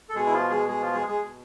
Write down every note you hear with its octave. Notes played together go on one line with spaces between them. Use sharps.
A4
B2 G#3 G#4
E4
F3 F4
G#3 G#4
G#3 G#4
F3 F4
G#3 G#4
G#3 G#4
B2